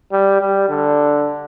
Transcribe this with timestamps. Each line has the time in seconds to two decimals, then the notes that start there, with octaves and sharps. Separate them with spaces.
0.12 G3
0.41 G3
0.69 D3